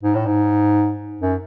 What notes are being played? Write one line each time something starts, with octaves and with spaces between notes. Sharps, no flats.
G#2
A2
G#2
F#2